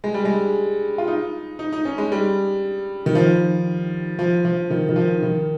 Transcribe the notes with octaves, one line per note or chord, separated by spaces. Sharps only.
G#3
G3
G#3
F4
D#4
D#4
D#4
C#4
G#3
G3
D#3
F3
F3
F3
D#3
D#3
F3
D#3